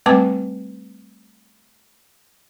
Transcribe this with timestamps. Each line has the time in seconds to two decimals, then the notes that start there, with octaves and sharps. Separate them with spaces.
0.06 G3 A3 C4 B4 A5 D6